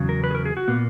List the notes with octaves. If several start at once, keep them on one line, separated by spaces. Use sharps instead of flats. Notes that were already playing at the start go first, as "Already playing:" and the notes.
Already playing: E2 C#3 F#3
A#4
B4
G#4
A#4
G#4
F#4
A#2 A#3 B3